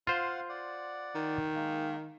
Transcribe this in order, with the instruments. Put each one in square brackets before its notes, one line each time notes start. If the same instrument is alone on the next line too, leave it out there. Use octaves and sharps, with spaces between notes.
[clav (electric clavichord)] F4 C5 [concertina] F5 F#5
[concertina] D5 F#5
[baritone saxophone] D#3
[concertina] G#3 A#3